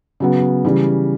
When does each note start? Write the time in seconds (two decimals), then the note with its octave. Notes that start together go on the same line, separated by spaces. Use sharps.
0.20 C#3 F#3 B3
0.65 C#3 E3 G3